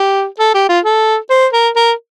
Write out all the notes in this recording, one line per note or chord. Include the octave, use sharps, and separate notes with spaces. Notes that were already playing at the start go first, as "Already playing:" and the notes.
Already playing: G4
A4
G4
F4
A4
C5
A#4
A#4